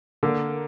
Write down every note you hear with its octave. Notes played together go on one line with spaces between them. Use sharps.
D3 A#3